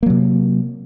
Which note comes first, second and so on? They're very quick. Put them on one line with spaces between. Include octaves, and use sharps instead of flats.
A#3 F#3 C3